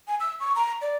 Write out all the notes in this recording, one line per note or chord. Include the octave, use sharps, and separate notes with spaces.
G#5
E6
C#6
A#5
D5